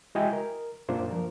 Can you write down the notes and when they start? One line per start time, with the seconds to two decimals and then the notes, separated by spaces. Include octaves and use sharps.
0.15 G#3 E4 F#4 D#5 G5 G#5
0.33 A#4
0.89 F#2 A#2 A#3 D4 F4 C5
1.11 F3 A#4